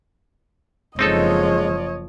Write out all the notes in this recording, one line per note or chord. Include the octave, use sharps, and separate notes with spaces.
F#1 F3 G#3 C4 D#4 A4 C#5 D#5